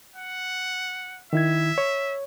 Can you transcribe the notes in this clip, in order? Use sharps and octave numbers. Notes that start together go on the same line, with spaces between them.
F#5
D#3 E4 E5 G#6
C#5